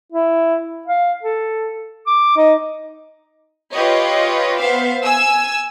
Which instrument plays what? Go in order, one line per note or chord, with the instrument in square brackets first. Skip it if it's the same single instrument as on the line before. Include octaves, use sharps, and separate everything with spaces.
[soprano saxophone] E4
F5
A4
D6
D#4
[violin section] F4 G4 B4 C#5 D#5
B3 C5 E5 F5
G#5 E6